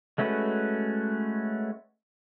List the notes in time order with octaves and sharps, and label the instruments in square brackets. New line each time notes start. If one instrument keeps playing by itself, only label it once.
[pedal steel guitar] G#3 A3 C#4 F#4 B4